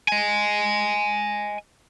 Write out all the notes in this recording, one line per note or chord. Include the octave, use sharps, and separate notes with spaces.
D#5 G#5